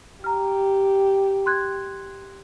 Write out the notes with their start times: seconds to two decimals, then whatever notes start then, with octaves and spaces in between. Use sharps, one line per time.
0.24 G4 A#5 F6
1.46 C6 F#6 G#6